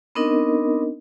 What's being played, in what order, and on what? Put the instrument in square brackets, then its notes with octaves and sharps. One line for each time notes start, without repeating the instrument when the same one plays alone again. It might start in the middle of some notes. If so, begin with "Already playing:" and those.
[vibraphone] B3 C4 D4 D#4 A#4 D#5